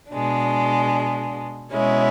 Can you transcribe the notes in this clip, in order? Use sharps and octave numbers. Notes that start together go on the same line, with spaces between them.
B2 G#3 D4
B2 G#3 C#4 E4